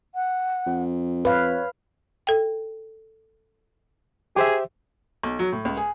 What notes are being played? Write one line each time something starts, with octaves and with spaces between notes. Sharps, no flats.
F#5
F2
B4 C#5 F5
A4 G5
G4 G#4 C5 E5
B1
F#3
A2
C#2
G#4